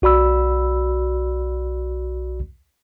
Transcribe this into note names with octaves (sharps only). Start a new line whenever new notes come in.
B1 F#4 D5 B5 E6